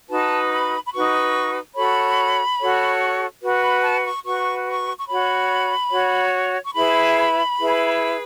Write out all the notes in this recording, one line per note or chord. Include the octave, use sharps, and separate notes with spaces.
D#4 F#4 B4 A5
B5
B5
D#4 F#4 B4 C#6
F#4 A4 C#5 B5
F#4 A4 C#5
F#4 B4
B5
A5
C#6
F#4 B4 C#6
C#6
C#6
F#4 C#5 B5
F#4 C#5
C#6
E4 G#4 B4 B5
E4 G#4 B4